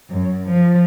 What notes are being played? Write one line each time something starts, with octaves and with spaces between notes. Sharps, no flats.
F#2
F3